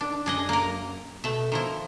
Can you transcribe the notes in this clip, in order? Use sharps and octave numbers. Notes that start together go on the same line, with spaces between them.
D#3 D4
F#2 D4 G#4 D#5
A#3 A#4
B2 A3 E5
D#3 F3 E4